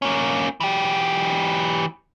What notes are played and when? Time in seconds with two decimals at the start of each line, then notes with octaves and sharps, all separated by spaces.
0.02 A#3 C#4
0.60 E3 G4